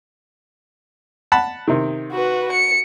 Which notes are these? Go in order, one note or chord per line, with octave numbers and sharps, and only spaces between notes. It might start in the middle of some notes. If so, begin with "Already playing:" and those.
F#5 A5 B5
C3 D#3
F#4 B4
C#7